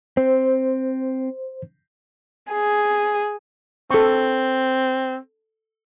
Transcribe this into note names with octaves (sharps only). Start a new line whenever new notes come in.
C4 C5
G#4
C4 A4 C#6